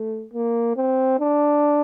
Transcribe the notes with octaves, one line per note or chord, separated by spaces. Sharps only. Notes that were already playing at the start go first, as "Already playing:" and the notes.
Already playing: A3
A#3
C4
D4